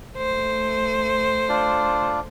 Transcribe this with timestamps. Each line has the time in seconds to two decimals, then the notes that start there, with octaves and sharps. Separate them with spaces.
0.16 A3 C5
1.49 D4 F4 D5